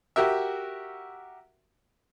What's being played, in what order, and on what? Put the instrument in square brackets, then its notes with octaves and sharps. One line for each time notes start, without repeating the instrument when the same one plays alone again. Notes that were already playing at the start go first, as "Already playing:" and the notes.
[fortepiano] F#4 G4 A#4 E5